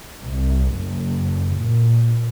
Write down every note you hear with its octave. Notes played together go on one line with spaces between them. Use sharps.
C2
F#1
A#2